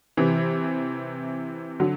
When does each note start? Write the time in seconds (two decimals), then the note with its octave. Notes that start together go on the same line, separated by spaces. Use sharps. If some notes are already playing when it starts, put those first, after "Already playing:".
0.17 C3 E3
1.80 D3 F#3